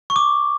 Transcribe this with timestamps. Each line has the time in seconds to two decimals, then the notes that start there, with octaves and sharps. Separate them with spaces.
0.10 C#6
0.16 D6